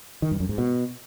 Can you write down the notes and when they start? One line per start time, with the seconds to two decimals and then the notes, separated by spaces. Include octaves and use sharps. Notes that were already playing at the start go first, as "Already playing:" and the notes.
0.22 D#3
0.31 G2
0.40 F#2
0.49 G#2
0.58 B2